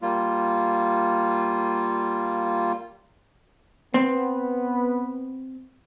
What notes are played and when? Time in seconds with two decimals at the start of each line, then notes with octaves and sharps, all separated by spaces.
0.02 G3 A#3 F4
3.94 B3 C4